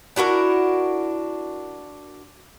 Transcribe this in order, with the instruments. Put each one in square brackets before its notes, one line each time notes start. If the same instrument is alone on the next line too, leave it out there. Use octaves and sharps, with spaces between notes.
[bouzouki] D4 E4 F#4 A#4